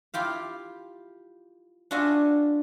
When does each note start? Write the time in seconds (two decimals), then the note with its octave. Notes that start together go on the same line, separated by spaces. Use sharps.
0.14 E4 F4 G4 F5
1.91 D4 F4 F#4 E5 G#5